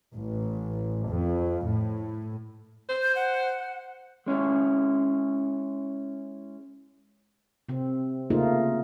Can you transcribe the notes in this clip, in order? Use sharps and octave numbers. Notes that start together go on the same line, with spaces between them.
A1
F2
A2
C5
G6
F#5
G#3 C#4 E4 G#4
C3 C4
C#3 A3 A#3 D#4 F4